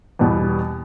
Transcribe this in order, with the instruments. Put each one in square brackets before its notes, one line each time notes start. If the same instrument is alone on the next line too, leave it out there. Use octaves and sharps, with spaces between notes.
[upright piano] E2 B2 G3 B3